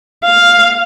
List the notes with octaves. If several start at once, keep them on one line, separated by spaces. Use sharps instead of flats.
F5